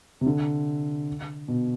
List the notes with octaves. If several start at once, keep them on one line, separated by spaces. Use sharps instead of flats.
C3
D3
B2